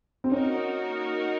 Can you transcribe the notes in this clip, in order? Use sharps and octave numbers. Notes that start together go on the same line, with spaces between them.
C4
A#3 C#4 D#4 F#4 A#4